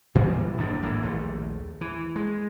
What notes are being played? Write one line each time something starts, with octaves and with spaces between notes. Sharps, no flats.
A#2 E3 F#3 G3
F#1 D#2 G#2 D4
G#1 A2 E3 A#3
A#1 D#2 A3
E3
G#3